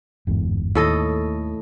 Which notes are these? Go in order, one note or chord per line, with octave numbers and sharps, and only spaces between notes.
G1 E2 G#2
D#2 A2 A4 D#5